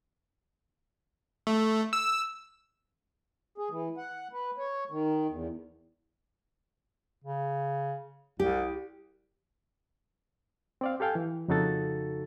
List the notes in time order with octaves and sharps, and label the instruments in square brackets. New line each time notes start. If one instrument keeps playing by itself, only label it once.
[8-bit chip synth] A3
E6
[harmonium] G#4
E3
F#5
B4
C#5
D#3
E2
[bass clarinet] C#3
[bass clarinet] C2 [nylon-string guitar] G4
[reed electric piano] C4 D5 F5
G4 A4 F5 G5 G#5
E3
F2 C#3 D#4 F#4 A4 A6